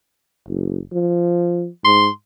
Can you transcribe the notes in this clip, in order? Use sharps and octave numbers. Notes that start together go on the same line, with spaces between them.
F#1
F3
G#2 C6